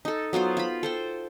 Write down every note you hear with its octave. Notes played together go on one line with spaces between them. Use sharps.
D#4 A4
F#3 B3 F4 C5
F4 B5
A4 C5 G5